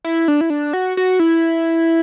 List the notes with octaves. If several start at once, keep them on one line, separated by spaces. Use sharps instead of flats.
E4
D4
E4
D4
F#4
F#4
E4